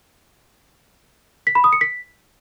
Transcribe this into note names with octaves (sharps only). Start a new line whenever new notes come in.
B6
B5
D#6
C#7
B6